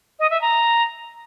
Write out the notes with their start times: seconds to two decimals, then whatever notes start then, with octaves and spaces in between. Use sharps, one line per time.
0.19 D#5
0.30 E5
0.42 A#5